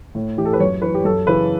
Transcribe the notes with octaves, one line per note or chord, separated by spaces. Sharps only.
A2
E3 G4
A4
B4
F#2 C#5
E3 B4
G4
F#2 A4
C#3 E3 B4